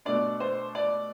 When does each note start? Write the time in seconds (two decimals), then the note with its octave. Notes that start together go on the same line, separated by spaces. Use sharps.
0.05 B2 A3 D4 D5
0.40 C5
0.75 D5